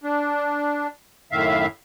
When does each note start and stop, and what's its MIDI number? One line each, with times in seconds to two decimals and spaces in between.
0.04 0.87 62
1.32 1.66 42
1.32 1.66 45
1.32 1.66 51
1.32 1.66 76
1.32 1.66 77